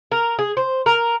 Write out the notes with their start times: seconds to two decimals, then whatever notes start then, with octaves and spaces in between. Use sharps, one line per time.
0.11 A#4
0.39 G#4
0.57 C5
0.86 A#4